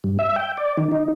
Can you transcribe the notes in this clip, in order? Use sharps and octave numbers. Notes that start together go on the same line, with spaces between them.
G2
E5
G5
D5
D#3
D#4